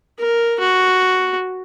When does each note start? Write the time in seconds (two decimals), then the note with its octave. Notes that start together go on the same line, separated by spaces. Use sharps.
0.19 A#4
0.60 F#4